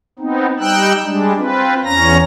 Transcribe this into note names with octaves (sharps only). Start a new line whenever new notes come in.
B3 C4 D#4
G3 D#4 G5 E6 F#6
G3 G#3 D4
C4 F4 B4
E2 C#4 A#5 A#6